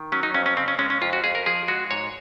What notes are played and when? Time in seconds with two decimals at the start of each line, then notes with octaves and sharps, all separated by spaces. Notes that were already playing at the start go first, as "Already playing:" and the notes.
Already playing: D#3
0.12 F#3 C#4
0.23 D#4
0.34 F2 C#4
0.46 C#4
0.57 C#3 C4
0.68 C#4
0.79 G#3 C#4
0.90 C#4
1.02 F2 F4
1.13 F#4
1.24 F2 G#4
1.35 A#4
1.46 F3 G#4
1.68 G#3 F#4
1.91 G#2 C#5